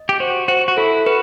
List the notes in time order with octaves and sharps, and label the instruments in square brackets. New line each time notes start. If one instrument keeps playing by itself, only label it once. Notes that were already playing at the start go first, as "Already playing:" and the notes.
Already playing: [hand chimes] D#5
[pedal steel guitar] G4
[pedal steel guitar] F#4 [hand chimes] C5
[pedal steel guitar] F#4 [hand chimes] C5
[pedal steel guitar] F#4
[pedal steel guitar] E4 [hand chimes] A4
[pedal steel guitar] F#4 [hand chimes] B4